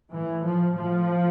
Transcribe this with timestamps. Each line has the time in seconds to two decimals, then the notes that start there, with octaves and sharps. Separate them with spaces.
0.12 A2 E3
0.44 F3
0.77 A2 F3